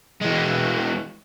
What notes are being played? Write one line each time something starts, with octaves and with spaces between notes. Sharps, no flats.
E3 G#3